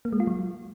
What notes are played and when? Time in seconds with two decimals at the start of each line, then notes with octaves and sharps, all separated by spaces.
0.05 A#3
0.13 G#3
0.20 F4
0.27 F#3